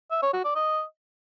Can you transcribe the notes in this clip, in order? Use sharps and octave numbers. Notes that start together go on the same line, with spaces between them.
E5
C#5
F#4
D5
D#5